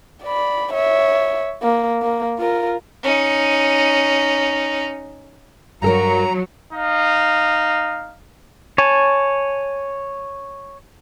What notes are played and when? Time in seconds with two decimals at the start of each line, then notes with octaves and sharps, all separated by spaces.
0.23 D5 B5
0.73 C#5 E5
1.62 A#3
2.02 A#3
2.39 F4 A#4
3.03 C#4 D#4
5.82 G2 F#3 A4 A#4 A#5
6.72 D#4 F5
8.78 C#5 G#5 A5